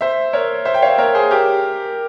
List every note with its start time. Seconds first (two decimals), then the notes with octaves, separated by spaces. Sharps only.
0.01 C5 E5
0.33 A#4 C#5
0.65 C5 E5
0.74 G5
0.82 C#5 F5
0.98 A#4 C#5
1.15 G#4 C5
1.31 G4 A#4